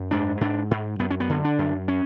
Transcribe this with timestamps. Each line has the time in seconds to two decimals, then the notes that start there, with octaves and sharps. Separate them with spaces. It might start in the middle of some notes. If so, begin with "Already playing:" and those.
Already playing: F#2
0.11 G#2 D4
0.41 G#2 D4
0.71 G#2
0.99 F#2 B3
1.11 C#4
1.20 B3
1.29 D3
1.45 D4
1.59 F#2
1.88 C#4